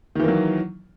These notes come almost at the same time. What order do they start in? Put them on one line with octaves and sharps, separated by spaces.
D#3 E3 A#3 F#3